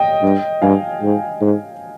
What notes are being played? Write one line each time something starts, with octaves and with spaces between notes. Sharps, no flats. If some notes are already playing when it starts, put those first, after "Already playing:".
Already playing: D#5 G5
G2
G2 F5 G#5
G#2
G#2